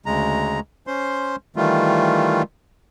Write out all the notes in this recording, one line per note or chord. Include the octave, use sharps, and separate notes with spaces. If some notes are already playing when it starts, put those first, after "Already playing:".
D2 C#3 G#3 A#5
C#4 C5 C6
D#3 E3 G3 A3 F4